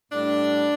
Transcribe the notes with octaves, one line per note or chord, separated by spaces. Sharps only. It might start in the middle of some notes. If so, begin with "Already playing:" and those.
A2 G3 D4